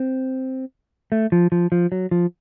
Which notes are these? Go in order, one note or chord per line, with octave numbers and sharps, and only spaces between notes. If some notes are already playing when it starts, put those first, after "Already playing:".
Already playing: C4
A3
F3
F3
F3
F#3
F3